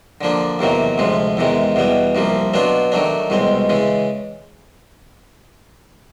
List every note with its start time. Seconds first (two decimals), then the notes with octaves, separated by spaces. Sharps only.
0.21 D3 F3 A#3 D4
0.59 E2 C3 D#3 F#3 A#3
0.98 D2 C3 F3 G#3
1.37 E2 C3 D#3 G#3
1.76 E2 B2 G3 B3
2.15 C2 C3 F3 A#3
2.54 B2 F#3 B3 D4 F4
2.92 D#3 F#3 A3 D4
3.30 C2 B2 G#3 C4
3.69 C#3 E3 G#3